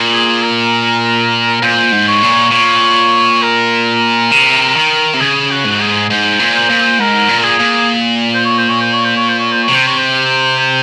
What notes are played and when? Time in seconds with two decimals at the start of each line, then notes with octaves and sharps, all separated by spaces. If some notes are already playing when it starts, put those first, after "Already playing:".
Already playing: A#2
0.13 G#4
0.43 A#4
1.63 A#2 C5
1.92 G#2
2.08 C#5
2.23 A#2
2.52 A#2 C#5
3.42 A#4
4.31 C3
4.76 D#3
5.14 C3
5.21 C#3 G#4
5.51 F#4
5.65 G#2
5.80 G#4
6.10 G#2 C5
6.40 A#2
6.54 C5
6.70 A#2
6.99 G#2 A#4
7.29 A#2
7.38 A#4
7.44 G#4
7.60 A#2
8.34 C5
8.45 C#5
8.58 C5
8.69 C#5
8.80 C5
8.93 C#5
9.04 C5
9.17 C#5
9.28 C5
9.39 C#5
9.51 C5
9.63 C#5
9.68 C3
9.74 C5
9.86 C#5
9.98 C5
10.58 C5